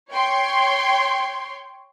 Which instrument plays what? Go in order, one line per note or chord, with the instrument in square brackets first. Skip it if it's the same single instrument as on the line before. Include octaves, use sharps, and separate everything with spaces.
[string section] C#5 G5 C6